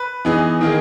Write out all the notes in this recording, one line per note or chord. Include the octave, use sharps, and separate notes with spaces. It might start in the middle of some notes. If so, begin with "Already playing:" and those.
Already playing: B4
E3 B3 D#4 G#4
D#3 A#3 D#4 G#4